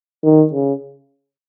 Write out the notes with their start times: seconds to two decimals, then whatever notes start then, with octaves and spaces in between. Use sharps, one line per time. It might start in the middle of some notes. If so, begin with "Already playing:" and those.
0.24 D#3
0.53 C#3